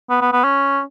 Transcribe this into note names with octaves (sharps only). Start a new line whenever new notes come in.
B3
B3
B3
C#4